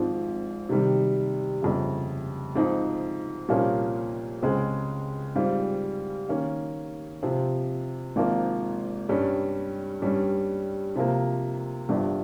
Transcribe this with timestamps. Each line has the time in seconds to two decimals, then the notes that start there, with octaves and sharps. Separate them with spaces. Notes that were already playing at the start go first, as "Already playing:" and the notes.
Already playing: G#1 G#2 F3 C4 F4
0.69 C3 D#3 G3
1.62 G1 F2 C#3
2.56 G#2 F3 C4 D#4
3.49 C2 A#2 F3 A#3 C#4
4.42 C#2 C#3 G#3 C4
5.36 G#2 G3 C4 F4
6.29 D#3 A#3 C#4
7.23 C3 F3 C4
8.16 G#1 G#2 F3 A#3
9.09 G2 G3 C#4
10.02 G2 G3 C#4
10.96 C3 F3 A#3
11.89 G1 G2 F3